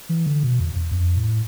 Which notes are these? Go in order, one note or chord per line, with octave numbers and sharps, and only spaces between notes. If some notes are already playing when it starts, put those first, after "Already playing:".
E3
D3
B2
E2
E2
F2
A2